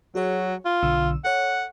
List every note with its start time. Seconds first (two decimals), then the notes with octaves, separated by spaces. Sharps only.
0.15 F#3 F#4 G#4 C#5
0.65 F4
0.82 B1 D3 E6
1.25 A4 C#5 F#5 F#6